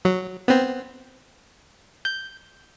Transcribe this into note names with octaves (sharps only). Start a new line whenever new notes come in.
F#3
B3 C4
G6